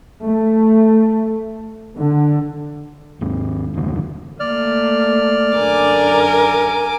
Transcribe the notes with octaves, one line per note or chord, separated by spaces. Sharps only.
A3
D3
D#2 G#2
F#1 D#2 D3
A3 A#3 D5 F6
F#2 D3 A#4 G#5 D6